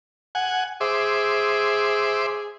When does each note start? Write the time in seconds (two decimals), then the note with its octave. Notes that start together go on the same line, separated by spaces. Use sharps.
0.35 F#5 G#5
0.81 G#4 C5 E5 D6